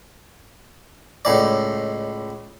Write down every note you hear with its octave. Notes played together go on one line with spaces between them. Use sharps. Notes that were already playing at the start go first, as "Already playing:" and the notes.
C#2 A2 D5